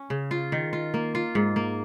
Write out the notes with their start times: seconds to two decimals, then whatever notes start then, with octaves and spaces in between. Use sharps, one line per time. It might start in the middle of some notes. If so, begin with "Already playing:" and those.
Already playing: C#4
0.10 C#3
0.31 F4
0.52 D#3
0.73 F4
0.94 A#3
1.15 F4
1.35 G#2
1.56 A#3